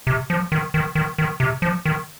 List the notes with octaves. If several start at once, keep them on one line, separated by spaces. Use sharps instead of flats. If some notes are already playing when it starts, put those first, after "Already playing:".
C3
F3
D#3
D#3
D#3
D#3
C3
F3
D#3